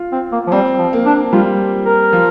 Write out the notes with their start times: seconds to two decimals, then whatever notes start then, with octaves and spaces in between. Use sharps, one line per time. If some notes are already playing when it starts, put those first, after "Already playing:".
Already playing: F4
0.12 C4
0.32 A#3
0.47 F3
0.52 G3 C4
0.79 F3
0.93 A#3
1.06 D4
1.33 G3 F4
1.86 A#4
2.13 F3